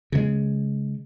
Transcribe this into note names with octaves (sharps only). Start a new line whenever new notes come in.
C#3 G#3